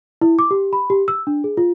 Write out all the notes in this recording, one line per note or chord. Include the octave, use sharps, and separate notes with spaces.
E4
D6
G4
B5
G4
E6
D4
G#4
F4